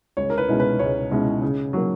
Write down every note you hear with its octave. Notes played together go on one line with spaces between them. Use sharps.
C#2 C#5
A#4
B4
B2 G#3 C#4 E4
B4
C#2 C#5
B2 G#3 C#4 E4
C#3
F#3 A#3